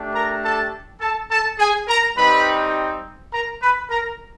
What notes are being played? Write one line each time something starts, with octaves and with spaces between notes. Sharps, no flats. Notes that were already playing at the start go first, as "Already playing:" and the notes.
Already playing: A3 D4 G4
A#4 A#5
A4 A5
A4 A5
A4 A5
G#4 G#5
A#4 A#5
G3 C4 D#4 B4 B5
A#4 A#5
B4 B5
A#4 A#5